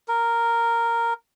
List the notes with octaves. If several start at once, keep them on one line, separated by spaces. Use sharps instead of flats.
A#4